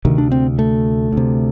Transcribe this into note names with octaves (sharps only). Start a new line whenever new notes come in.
D2 C3 D#3
D4
C4
A3
D2 C3